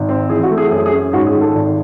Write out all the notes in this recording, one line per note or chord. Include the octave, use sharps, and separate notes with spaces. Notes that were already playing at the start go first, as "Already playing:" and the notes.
Already playing: G#1
C4
E3 G#4
F#4
A3
G#4
F#2 G#4
G#4
C#4
G#2 F#4
G#4
D#3
A4
G#1